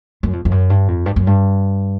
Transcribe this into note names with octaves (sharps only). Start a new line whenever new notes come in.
F#2
F2
F2
F#2
G2
F2
G2
F#2
G2